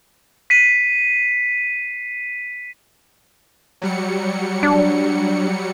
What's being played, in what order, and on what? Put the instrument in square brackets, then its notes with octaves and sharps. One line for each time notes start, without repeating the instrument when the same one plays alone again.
[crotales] B6 C7 D#7
[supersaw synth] F#3 G3 C#7
[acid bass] D4